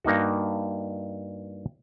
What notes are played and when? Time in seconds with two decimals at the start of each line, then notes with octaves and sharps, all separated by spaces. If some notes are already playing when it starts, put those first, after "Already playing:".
0.05 G2 A#3 D#4 F#4